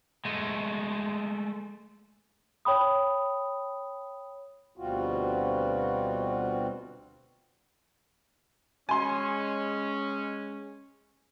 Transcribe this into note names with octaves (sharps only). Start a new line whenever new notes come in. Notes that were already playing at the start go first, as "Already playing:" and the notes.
G#3 A3
C#5 G5 B5 D#6
D2 B2 G3 C4 F4 F#4
G#3 C#4 G#5 C6